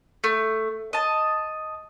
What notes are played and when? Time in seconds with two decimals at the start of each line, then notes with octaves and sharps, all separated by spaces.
0.24 A3
0.93 D#5 A5